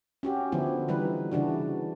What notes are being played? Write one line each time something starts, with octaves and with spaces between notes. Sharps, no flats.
C#4 F#4 G4
D3 F3 B3 E4
D3 E3 G3 D#4 B4
C#3 E3 D4 F#4